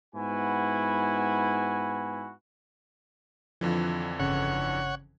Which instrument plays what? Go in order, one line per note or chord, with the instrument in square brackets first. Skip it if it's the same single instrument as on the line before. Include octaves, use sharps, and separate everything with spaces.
[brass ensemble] G#2 B3 E4 F#4 G#5
[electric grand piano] F2 D3 E3 [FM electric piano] F3 F4
[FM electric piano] G1 C#3 G#6 [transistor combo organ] C#5 F#5